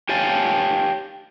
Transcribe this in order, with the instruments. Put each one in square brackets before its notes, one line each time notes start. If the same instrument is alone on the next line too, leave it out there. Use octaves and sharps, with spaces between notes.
[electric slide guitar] G4 C#5 F5 G#5 A5